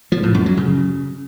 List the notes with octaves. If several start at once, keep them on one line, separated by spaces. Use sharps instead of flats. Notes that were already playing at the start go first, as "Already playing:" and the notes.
F3
A2
F#2
F#3
C#3